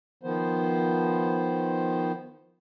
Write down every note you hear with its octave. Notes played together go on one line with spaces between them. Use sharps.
D#3 F3 B3 C5